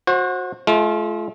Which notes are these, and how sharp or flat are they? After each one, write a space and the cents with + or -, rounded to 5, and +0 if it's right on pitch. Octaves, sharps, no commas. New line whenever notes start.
F#4 -20 C5 +25
A3 -45 F4 -15